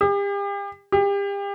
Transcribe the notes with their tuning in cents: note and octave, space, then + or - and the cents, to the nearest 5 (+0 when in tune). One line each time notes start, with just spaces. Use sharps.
G4 +40
G4 +35